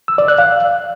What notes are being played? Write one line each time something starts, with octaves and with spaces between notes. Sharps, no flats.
E6
D5
F#6
F5